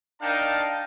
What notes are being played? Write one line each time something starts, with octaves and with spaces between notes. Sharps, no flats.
D4 D#4 A#4 F5 G5 A5